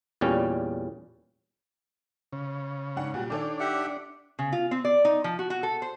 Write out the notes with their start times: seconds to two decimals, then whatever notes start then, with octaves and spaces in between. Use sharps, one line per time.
0.21 E2 A#2 G3 C#4
2.32 C#3
2.96 G#2 D4 F#5
3.14 A#2 G3 F#4
3.30 D#3 D4 A4 C#5
3.60 G4 E5 F#5
4.39 C#3
4.52 F4
4.71 C4
4.85 D5
5.05 D#4
5.24 F3
5.39 F#4
5.50 F#4
5.63 A4
5.82 C5